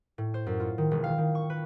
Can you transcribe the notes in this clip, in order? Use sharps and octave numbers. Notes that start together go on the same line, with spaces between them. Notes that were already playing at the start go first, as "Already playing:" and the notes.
A2
C5
F#2
F4
D#3
E1
F5
D#3
C#6
B4